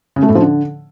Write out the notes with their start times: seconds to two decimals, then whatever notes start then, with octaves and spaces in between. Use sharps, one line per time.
0.16 C#3
0.23 A3
0.29 A2
0.35 F3
0.42 D3